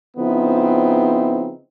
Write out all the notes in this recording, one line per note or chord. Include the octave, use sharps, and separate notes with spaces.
C#3 F3 B3 C4 D#4 E4